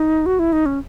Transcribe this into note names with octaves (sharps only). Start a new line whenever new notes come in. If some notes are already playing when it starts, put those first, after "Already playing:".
Already playing: D#4
F#4
E4
D#4
C#4